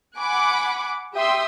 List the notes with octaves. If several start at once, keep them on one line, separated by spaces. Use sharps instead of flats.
F#5 G#5 B5 D6
G4 E5 G5 C6 D#6 E6